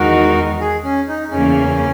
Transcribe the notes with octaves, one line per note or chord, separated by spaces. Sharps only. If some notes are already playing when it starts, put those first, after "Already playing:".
Already playing: E2 D#3 G#3 D#4 F#4 A#4
G#4
C#4
D#4
E2 C#3 E3 A#3 C#4